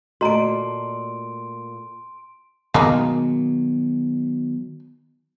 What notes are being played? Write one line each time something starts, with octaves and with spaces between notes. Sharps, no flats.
A#2 A3 F#4 D#5 A#5 C6 D7
B2 D#3 F#3 G#3 A#3 D#4